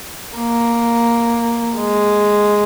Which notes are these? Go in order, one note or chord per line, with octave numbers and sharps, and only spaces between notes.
A#3
G#3